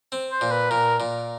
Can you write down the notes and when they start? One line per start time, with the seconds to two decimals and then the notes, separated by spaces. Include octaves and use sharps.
0.12 C4
0.32 C5
0.41 A#2
0.51 B4
0.70 A#2 A#4
1.00 A#2